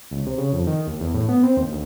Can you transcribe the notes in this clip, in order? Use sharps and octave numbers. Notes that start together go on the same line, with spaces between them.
C#2
C3
C#3
F2
D#3
D#2
E2
A2
B3
C4
D#2
D2